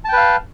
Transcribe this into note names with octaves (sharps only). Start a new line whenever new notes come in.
B4 F5 G5 A5